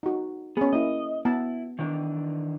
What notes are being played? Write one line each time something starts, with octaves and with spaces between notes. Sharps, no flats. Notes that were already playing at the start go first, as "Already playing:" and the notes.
D#4 F#4
B3 C#4 G#4
A#3 E4 D#5
B3 E4 A5
D#3 E3 D4